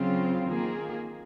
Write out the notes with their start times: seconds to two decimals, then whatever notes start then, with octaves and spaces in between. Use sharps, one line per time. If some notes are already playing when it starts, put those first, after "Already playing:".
Already playing: C#3 F#3 C4 F4
0.48 D#3 A#3 F4 G#4